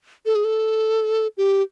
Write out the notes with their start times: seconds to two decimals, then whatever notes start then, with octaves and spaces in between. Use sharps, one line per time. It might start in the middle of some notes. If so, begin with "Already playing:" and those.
0.26 A4
0.35 G#4
0.44 A4
1.37 G4